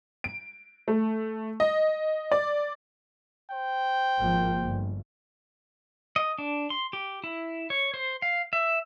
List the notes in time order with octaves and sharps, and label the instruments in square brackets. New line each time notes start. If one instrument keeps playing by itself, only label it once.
[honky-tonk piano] D7
A3
D#5
D5
[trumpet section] C5 G5
[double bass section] G#1 F3 A#3
G1
[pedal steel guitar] D#5
D4
C6
G4
E4
C#5
C5
F5
E5